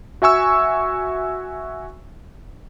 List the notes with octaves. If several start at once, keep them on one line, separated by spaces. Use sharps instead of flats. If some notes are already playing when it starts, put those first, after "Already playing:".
F#4 E5 G#5 C#6 E6